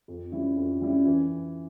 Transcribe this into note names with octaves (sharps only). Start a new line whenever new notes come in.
F2
C#3 G3 C#4 E4
F2
C#3 G3 C#4 E4
E3